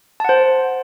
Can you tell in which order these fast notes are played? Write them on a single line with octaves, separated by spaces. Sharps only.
A5 F#5 C5